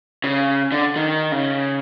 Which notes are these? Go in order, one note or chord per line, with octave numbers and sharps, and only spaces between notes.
C#3
D3
D#3
C#3